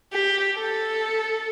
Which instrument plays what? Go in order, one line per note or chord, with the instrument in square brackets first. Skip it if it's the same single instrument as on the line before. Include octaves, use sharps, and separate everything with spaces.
[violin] G4
A4